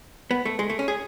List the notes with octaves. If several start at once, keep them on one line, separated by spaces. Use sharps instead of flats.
B3
A3
G#3
A3
C#4
G#4